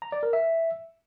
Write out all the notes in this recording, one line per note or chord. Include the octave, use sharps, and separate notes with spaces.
A#5
D5
A#4
E5